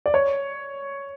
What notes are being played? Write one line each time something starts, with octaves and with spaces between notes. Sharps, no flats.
D5
C#5